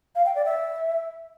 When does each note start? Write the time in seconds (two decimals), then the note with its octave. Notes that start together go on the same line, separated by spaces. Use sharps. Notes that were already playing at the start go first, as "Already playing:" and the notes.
0.16 F5
0.25 G5
0.35 D5
0.45 E5